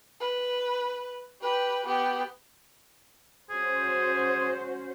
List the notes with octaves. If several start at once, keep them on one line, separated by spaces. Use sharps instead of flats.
B4
G4 B4
B3 G4
C#4 F#4 G#4 C5